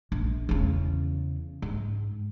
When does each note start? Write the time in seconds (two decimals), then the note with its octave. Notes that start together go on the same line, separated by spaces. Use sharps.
0.12 A#1
0.49 E2 C#3
1.62 G#2